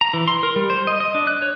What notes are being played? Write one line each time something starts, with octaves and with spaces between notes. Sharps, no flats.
A#5
E3
C6
A#4
G3
C5
D#5
D#5
D4
F#6
C#5